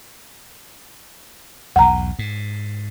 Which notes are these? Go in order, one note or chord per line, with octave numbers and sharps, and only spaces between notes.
B1 E2 F#5 A#5
G#2